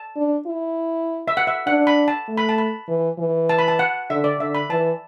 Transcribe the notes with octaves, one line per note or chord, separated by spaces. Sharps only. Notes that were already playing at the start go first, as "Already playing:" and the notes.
Already playing: A5
D4
E4
E5
F#5
E5
D4 F#5
B5
A5
A3
B5
A5
B5
E3
E3
A5
B5
A5
F#5
D3 E5
D5
D3 E5
B5
E3 A5